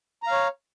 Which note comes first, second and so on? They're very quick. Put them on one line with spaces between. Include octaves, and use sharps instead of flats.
A#5 F5 C#5